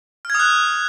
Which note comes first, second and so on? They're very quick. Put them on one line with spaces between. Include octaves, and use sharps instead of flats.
F6 G#6 D#6 F#6